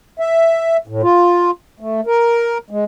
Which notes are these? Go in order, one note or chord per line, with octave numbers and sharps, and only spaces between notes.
E5
A2
F4
A3
A#4
G#3